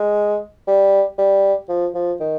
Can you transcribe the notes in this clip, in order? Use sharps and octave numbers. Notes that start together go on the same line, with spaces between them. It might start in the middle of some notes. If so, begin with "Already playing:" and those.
Already playing: G#3
G3
G3
F3
F3
D#3